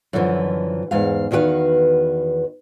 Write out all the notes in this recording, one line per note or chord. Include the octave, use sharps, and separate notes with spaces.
F#2 D3 E3 F3
E2 G#2 F5
E2 D#3 F#4 G4 B4 F5